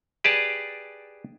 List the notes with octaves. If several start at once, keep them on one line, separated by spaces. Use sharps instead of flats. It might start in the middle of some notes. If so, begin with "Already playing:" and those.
G4 G#4 B4 D5 A5